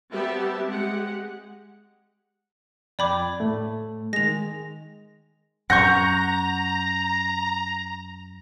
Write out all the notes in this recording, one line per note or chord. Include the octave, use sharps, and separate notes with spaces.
G3 B3 C4 G4 E5 A5
G#3 G4 G#4 F#5
F2 D5 G5 B5 D6 G#6
A2 A3
D#3 G#3 A#6 F7
F#2 F#5 A#5 C#6 G6 A#6